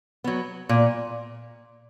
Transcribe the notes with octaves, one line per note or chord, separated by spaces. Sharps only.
F#3 B3
A#2